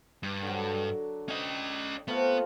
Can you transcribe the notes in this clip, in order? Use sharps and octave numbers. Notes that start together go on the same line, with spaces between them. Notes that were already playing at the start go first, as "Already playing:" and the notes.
G2
D3 F#3
C#4 D#5 G5
A3 B3 C4 F4